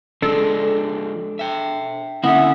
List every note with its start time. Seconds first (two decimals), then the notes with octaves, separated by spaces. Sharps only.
0.22 F3 G#3 D4 A4
1.39 E5 G5
2.24 D3 A#3 C4 C#4 E4 E5 F#5 D#6